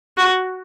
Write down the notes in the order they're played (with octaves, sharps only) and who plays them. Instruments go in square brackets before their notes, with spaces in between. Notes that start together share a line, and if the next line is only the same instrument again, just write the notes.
[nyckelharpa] F#4